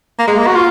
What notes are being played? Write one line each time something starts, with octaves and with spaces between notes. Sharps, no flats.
A#3
G#3
A#3
F#4
F4